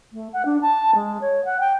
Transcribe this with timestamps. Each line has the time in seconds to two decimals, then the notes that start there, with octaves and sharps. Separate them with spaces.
0.13 A3
0.33 F#5
0.45 D4
0.61 A5
0.95 G#3
1.21 C#5
1.45 F#5
1.60 G5